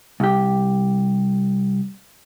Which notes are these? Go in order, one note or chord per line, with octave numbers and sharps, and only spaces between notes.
C2 G4